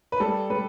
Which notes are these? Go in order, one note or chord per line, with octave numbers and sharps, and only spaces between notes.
B4
G3 A4
G3 B4